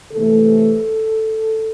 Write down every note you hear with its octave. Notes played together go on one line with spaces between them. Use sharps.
C3 E3 A3 A4